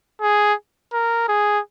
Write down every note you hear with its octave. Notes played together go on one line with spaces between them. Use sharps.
G#4
A#4
G#4